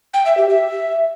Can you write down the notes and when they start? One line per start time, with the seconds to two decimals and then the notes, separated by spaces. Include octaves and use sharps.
0.14 G5
0.26 E5
0.37 G4
0.49 E5